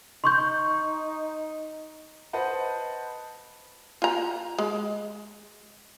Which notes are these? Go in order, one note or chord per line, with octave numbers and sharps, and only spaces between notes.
D#4 C6 C#6 G6
B4 C5 D#5 F#5 A5
F4 A#5
G#3